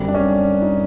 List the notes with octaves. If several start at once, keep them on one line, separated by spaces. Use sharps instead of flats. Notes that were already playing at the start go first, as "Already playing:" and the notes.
Already playing: F#2 D3 G3 C4
D4
C#4
D#4
D4